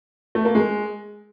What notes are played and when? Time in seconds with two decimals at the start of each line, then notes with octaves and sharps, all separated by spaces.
0.35 A3
0.45 A#3
0.55 G#3